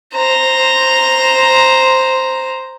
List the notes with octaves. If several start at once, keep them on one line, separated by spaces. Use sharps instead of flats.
C5 A#5